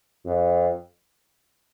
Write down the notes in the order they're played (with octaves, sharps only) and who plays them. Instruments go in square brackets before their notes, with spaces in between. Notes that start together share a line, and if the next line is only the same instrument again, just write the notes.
[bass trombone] F2